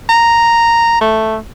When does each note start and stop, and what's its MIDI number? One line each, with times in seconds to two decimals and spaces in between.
0.09 0.99 82
1.01 1.36 57